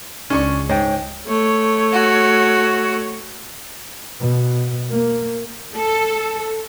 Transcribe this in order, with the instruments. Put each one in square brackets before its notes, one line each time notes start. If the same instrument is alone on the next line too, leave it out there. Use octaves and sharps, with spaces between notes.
[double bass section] C#2 [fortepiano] C#4 D4 C#6
[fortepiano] G#2 [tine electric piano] C#5 G5
[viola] A3 C#5
[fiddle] F#4
[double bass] B2
A#3
[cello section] A4